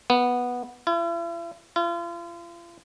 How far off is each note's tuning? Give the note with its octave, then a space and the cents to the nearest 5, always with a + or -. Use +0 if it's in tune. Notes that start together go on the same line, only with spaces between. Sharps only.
B3 -5
E4 +45
F4 -40